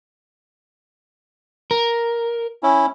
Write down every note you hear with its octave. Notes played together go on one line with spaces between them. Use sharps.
A#4
C#4 E4